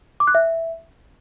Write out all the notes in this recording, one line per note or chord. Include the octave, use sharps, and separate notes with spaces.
D6
F#6
E5